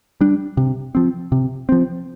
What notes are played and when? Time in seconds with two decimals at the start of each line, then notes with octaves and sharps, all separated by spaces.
0.21 G3 D4
0.57 C3
0.95 F3 C4
1.32 C3
1.69 F3 C4